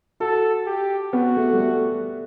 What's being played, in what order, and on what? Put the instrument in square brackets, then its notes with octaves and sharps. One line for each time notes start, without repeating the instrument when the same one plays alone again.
[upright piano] F#4 [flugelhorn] A4
[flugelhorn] G4
[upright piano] B3 [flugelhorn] F#4
[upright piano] A3
G3
A3